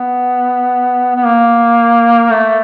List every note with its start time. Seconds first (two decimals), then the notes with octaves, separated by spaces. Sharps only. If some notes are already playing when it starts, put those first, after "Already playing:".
Already playing: B3
1.15 B3
1.25 A#3
2.31 A3